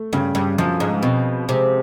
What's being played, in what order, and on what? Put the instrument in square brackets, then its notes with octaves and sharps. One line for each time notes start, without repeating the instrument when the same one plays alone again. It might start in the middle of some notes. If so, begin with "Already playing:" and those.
Already playing: [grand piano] A3
[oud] G2 [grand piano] C#3
[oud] G2
[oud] F#2 [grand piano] F3
[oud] G#2
[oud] B2 [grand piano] C4
[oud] C3 [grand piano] G#3